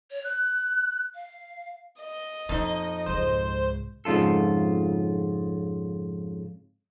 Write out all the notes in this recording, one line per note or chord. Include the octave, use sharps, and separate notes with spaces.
C#5
F#6
F5
D#5
F2 A#2 D#4
C#2 G#2 C5
F2 G#2 C#3 F4 A4